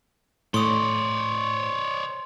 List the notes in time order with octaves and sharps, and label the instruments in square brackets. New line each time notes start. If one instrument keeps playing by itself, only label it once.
[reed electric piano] A2 [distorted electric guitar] C#5 D5 [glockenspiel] C6 D#6